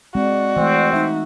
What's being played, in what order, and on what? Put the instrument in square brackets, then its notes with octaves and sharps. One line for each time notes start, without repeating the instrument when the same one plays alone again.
[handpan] G#3 C4 [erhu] F#4 [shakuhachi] D5
[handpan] E3 A3 [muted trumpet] C4
[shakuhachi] D#4 [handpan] E5